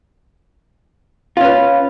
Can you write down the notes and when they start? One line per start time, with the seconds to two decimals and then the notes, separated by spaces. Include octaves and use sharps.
1.37 F4
1.41 C#4
1.44 B4